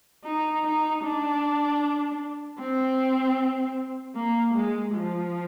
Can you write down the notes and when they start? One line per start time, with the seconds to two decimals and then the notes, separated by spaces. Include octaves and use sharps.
0.25 D#4
0.65 D#4
1.04 D4
2.58 C4
4.16 A#3
4.54 G#3
4.94 F3